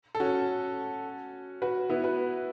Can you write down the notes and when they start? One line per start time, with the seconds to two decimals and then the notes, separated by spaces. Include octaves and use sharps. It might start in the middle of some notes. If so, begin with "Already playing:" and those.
0.15 A4
0.20 C#4 F#4
1.62 F#4 B4
1.90 B3 E4
2.04 F#4 B4